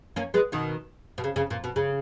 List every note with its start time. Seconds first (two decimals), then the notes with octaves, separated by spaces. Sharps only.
0.16 A#3 C#4
0.34 G#3 B3
0.52 B2 D#3
1.18 B2
1.24 C#3
1.36 C#3
1.51 A#2
1.64 B2
1.76 C#3